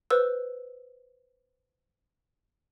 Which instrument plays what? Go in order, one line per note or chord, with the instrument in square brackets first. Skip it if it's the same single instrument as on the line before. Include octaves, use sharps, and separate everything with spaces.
[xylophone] B4 C5 E6